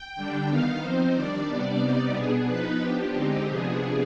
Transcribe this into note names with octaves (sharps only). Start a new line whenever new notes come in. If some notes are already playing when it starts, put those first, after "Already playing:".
Already playing: G5
D3 G3 D4
D#3 B3 D#4 F5
F3 C4 D#4 C5
D#3 G3 D4 D5
C3 G3 B3 D4
C3 G3 B3 D#4
B2 B3 D4 G#4
F3 B3 D#4 B4
F3 B3 D4 G4
D3 G#3 C4 D#4
C3 F3 B3 D4 G#4